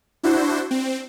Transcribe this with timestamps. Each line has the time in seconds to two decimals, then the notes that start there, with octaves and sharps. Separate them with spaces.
0.23 D4 E4 F#4 C5
0.71 C4